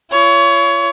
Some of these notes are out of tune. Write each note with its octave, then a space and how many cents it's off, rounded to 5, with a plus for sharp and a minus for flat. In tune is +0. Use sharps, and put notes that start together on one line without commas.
F4 -45 C#5 +25